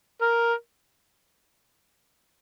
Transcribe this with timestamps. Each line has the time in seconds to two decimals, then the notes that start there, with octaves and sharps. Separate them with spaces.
0.21 A#4